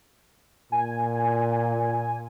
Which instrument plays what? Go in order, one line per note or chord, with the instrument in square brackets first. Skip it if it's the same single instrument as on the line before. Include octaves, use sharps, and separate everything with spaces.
[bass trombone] A#2 [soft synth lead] G#5